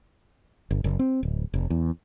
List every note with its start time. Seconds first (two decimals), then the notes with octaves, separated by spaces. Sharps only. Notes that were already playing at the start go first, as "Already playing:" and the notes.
0.71 G1
0.84 F#1
0.99 C4
1.23 D1
1.54 F1
1.70 E2